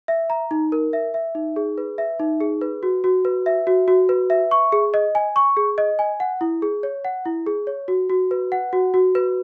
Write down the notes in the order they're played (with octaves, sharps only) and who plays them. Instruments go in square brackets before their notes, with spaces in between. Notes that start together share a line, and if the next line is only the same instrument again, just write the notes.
[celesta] E5
A#5
D#4
A#4
E5
E5
D#4
G#4
B4
E5
D#4
G#4
B4
F#4
F#4
B4
E5
F#4
F#4
B4
E5
C#6
G#4
D#5
G#5
C#6
G#4
D#5
G#5
F#5
E4
G#4
C#5
F#5
E4
G#4
C#5
F#4
F#4
B4
F#5
F#4
F#4
B4